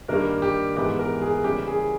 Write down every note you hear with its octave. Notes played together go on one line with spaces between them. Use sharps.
G2 D#3 G3 A#3 A#4
G4
G#2 E3 G#3 B3 G4
A#4
G#4
C#3 E3 G3 A#3 C#4 G4
G#4